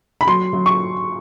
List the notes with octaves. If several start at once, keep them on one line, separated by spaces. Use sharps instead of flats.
B5
F#3 C6
F#3
C#6